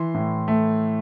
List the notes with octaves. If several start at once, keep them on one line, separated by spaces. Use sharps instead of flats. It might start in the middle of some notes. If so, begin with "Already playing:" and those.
Already playing: E3 C6
A2
A3